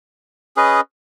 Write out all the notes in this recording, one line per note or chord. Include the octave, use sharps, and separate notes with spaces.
C#4 G#4 B4 D#5